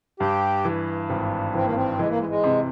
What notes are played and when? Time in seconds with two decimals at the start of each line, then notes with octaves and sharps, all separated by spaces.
0.20 G2 G4
0.65 E3
1.10 G#1
1.55 E3 C4
1.64 A#3
1.75 C4
1.99 E3 G#3
2.09 A#3
2.19 G#3
2.29 G#3
2.44 C3